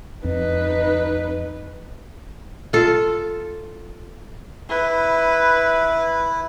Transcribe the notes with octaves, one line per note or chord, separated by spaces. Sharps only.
F2 D#4 B4
F4 A4
E4 B4